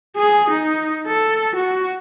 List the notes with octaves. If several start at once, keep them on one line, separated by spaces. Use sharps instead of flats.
G#4
D#4
A4
F#4